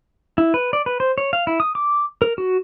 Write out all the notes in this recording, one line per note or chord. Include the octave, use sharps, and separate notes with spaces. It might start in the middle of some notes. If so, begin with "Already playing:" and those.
E4
B4
D5
B4
C5
C#5
F5
E4
D#6
D6
A#4
F#4